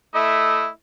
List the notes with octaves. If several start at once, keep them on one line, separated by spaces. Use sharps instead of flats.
A3 E4 D#5